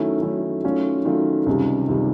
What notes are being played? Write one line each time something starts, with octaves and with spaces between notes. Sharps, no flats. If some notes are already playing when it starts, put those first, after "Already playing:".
Already playing: D#3 F#3 A3 C#4 E4
D#3 F#3 A3 C#4 E4
D#3 F#3 A3 C#4 F4
D#3 F#3 A3 C#4 F4
C#2 C3 D#3 G3
C#2 C3 D#3 G3